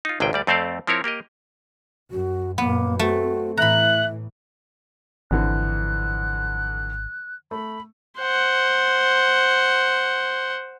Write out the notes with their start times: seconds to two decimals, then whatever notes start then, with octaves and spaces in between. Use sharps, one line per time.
0.05 D#4 F4
0.20 G#1 C#2 C3 G#4 E5 G5
0.33 D2 G3 D5
0.47 F2 A3 C4 C5 D5 F5
0.87 F3 C4 E4 A#4 C#5
1.04 A#3 G4 A#4 D#5
2.11 F#2 F#4
2.58 F#2 A#2 A#3 B3
2.99 A3 C4 F#4
3.57 A2 E3 E5 A#5 B5 F#6
5.31 G#1 F2 D3 E3 F#6
7.51 A3 B5
8.19 C5 F#5